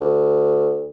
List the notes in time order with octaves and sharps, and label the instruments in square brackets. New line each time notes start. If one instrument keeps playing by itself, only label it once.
[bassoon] D2